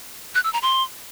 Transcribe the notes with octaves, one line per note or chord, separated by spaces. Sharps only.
F#6
E6
A#5
C6